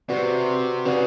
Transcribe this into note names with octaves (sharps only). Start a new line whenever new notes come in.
C3 F#4 B4 D5 F#5
C#3 F#4 B4 D5 F#5